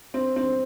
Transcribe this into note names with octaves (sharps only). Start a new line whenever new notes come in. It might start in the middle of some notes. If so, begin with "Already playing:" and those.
C4
C4